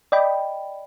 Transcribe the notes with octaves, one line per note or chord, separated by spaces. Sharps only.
D5 D#5 G5 B5